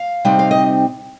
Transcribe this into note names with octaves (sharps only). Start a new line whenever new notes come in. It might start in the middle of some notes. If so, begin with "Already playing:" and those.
Already playing: F5
C3 G3 C4 D#4
F5
D#5